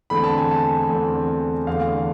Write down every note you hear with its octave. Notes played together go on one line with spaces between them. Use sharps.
E2 D3 A3 C4 B5
A5
G#5
A5
E2 D3 A3 C4
E2 D3 A3 F5